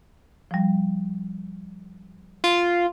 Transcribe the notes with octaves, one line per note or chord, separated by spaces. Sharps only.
F3 G3
F4